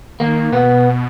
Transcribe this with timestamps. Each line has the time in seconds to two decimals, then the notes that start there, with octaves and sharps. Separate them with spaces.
0.20 D#3 A#3
0.52 B2 B3